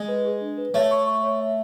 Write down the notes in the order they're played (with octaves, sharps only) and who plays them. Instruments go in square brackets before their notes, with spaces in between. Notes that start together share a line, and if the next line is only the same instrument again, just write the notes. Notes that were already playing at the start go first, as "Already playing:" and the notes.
Already playing: [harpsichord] G#3
[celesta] B4
G#4
D4
B4
[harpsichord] A3 [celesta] C#5
[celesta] C#6
C#6
C#5
E5